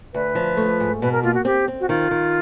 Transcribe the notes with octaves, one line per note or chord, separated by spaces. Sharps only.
D2 B4
F3
A3
G#2
B2 B4
A#4
A#3 F4
F#4
C4 G4
C4
F#4
D#3 F4
D#3